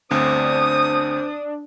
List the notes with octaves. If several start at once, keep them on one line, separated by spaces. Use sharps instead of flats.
G1 D2 C4 D4 C5 D#6